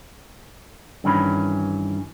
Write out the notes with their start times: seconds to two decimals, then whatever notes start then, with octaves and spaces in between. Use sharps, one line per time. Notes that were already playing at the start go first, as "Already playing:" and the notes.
1.04 G2 D#3 E3 C#4 B5